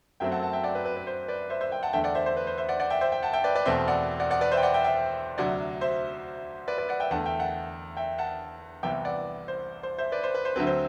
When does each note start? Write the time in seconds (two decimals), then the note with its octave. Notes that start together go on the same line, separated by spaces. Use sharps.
0.20 F#2 F#3 A3 C4 E5 G5
0.32 F#5 A5
0.42 F#5 A5
0.53 E5 G5
0.63 D5 F#5
0.75 B4
0.85 B4
0.97 B4
1.07 C5
1.28 B4 D5
1.50 C5 E5
1.61 C5 E5
1.71 E5 G5
1.83 F#5 A5
1.93 E2 D3 A3 E5 G5
2.04 D5 F#5
2.15 C5 E5
2.26 C5
2.37 B4
2.47 C5
2.58 C5 E5
2.69 D5 F#5
2.80 D5 F#5
2.90 E5 G5
3.01 C5 E5
3.12 E5 G5
3.23 F#5 A5
3.33 E5 G5
3.44 B4 D5
3.55 B4 D5
3.65 E2 B2 A3 C4 C5 E5
3.88 D5 F#5
4.20 D5 F#5
4.31 D5 F#5
4.41 B4 D5
4.52 C5 E5
4.57 G5
4.63 D5 F#5
4.74 E5 G5
4.84 E5 G5
5.38 D2 C3 F#3 D5 F#5
5.81 C5 E5
6.68 B4 D5
6.78 B4 D5
6.89 D5 F#5
7.00 E5 G5
7.11 E2 D3 A3 F#5 A5
7.25 E5 G5
7.40 F#5 A5
7.97 E5 G5
8.18 F#5 A5
8.83 C2 C3 E3 B3 E5 G5
9.05 D5 F#5
9.48 C5
9.83 C5
9.98 C5 E5
10.12 B4 D5
10.23 C5
10.35 B4
10.45 C5
10.56 D2 D3 F#3 C4 B4
10.67 C5